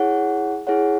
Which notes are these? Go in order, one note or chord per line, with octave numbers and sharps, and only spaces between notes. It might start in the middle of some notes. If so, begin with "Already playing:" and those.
Already playing: E4 G#4 C#5 F#5
E4 G#4 C#5 F#5